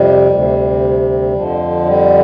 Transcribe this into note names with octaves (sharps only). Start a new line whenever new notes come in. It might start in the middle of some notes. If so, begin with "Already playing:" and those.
Already playing: F2 C3 G3
D2 C3
F2 D3 F3
G3